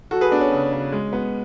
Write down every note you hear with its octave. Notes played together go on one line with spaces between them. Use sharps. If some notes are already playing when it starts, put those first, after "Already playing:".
F#3 F#4 A4
G#4 B4
B3 D4
C#4
C#3
C#3
G#3
B3